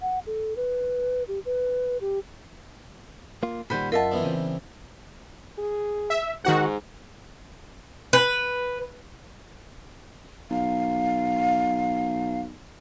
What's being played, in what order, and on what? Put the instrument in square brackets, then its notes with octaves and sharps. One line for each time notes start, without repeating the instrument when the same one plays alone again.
[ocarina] F#5
A4
B4
G4
B4
G4
[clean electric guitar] A#3 F4
[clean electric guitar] A#2 D#3 G3 [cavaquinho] C5 F#5 B5 [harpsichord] G#5
[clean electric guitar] F#2 [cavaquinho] F4 E5 A5 [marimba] A#4 D#5 F#5
[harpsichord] E3 B3 D4
[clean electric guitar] C#3 C4
[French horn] G#4
[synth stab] E5
[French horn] G#2 [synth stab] D#3 F#4 F#5
[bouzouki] B4
[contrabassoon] B1 [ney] F5